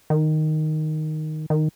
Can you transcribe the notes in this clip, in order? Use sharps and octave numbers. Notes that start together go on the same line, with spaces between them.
D#3
D#3